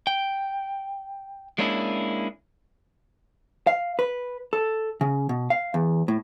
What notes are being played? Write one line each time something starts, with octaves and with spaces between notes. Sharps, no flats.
G5
G#3 A#3 C#4 D4 E4
F5
B4
A4
C#3
B2
F5
E2
A2